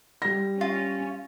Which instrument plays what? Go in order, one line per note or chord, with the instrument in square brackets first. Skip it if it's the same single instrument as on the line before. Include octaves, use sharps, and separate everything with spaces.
[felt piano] G3 A#6
[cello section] C#4 [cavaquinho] F4